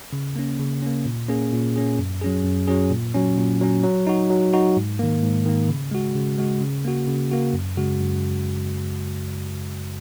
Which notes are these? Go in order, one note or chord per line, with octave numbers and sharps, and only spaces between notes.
C#3
A#3 C#4
C#3
A#3 C#4
A#2
A#3 C#4 G#4
A#2
A#3 C#4 G#4
F#2
F#3 C#4 G#4
F#2
F#3 C#4 G#4
A#2
F#3 C#4
A#2
F#3 C#4
F#3
D#4 F#4
F#3
D#4 F#4
G#2
D#3 A#3
G#2
D#3 A#3
C#3
G#3 F#4
C#3
G#3 F#4
C#3
A#3 F#4
C#3
A#3 F#4
F#2
C#3 G#3 F#4
F#2